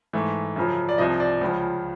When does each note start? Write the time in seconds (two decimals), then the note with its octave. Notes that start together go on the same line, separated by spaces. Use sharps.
0.13 G#2 E3 A3
0.56 F#2 C#3 F3
0.89 D5
0.98 C2 C3 F3 D#5
1.20 D5
1.41 C#2 C#3 F3